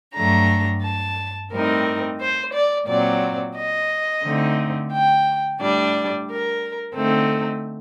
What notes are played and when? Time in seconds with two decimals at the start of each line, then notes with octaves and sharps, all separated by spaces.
0.15 G2 F#3 A3 D4 A#5
0.83 A5
1.51 A2 G3 C4 D#4 A#4
2.20 C5
2.53 D5
2.87 A#2 F#3 C4 D5
3.56 D#5
4.23 D3 A3 C4 D#4
4.92 G5
5.60 A2 G3 D4 D5
6.28 A#4
6.95 D3 A3 C4 D#4 A4